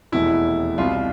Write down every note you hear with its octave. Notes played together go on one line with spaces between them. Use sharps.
F1 E2 B2 E4
C2 B2 F4